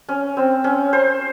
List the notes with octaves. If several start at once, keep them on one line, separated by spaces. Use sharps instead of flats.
C#4
C4
C#4
C5